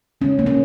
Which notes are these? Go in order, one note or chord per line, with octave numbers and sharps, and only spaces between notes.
C#3 G#3 C#4
A#3
C#4